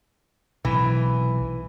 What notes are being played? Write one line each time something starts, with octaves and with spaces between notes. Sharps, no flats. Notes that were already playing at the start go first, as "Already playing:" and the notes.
B1 A2 C3 E3